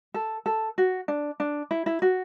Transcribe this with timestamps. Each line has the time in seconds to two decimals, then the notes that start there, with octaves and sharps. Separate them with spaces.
0.14 A4
0.46 A4
0.78 F#4
1.08 D4
1.40 D4
1.71 E4
1.86 E4
2.02 F#4